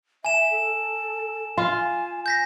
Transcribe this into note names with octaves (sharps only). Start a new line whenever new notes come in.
E5 G#5 E7
A4
F4 G#5
G#5 G6 A#6 B6